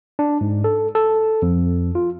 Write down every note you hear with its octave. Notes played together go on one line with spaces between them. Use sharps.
D4
G#2
A4
A4
F2
F4